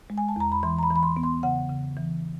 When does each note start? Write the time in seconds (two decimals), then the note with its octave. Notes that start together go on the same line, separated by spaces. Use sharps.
0.10 G#3
0.18 G#5
0.28 A5
0.36 E2 A#5
0.52 B5
0.63 E3 C6
0.79 A#5
0.83 B5
0.90 E3
0.96 B5
1.03 C6
1.17 B3
1.23 C6
1.43 C#3 F#5
1.69 C#3
1.96 E3